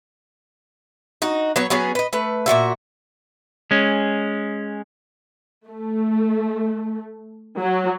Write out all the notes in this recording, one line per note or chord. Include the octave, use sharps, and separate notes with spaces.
D#4 F#4
F#3 B3 C#5
F#3 B3 C#4 G#4
B4 D#5
A3 B4
A#2 G#3 F#4 E5
G#3 C#4
A3
F#3